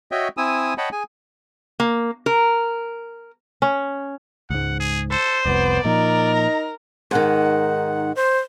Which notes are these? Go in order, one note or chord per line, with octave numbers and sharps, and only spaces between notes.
F#4 C#5 D#5 E5 G5
C4 E4 G#5 D#6 E6
C#5 D#5 F#5 G5 A5 B5
G#4 G#5
A#3
A#4
C#4
C#2 G#2 F#5
G#4
A4 C5
F1 C2 F2 B3 D5
A#2 F3 D#4 A#4
A#5
G#2 D#3 F#5
C5